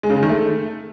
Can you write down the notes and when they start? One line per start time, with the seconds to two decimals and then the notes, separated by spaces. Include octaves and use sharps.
0.03 G#3
0.10 C#3
0.16 G#3
0.23 D#3
0.29 A3